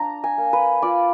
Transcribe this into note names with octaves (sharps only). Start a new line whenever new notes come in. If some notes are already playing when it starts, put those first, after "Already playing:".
Already playing: D4 A#5
G#5
A#3
B4
F4 D5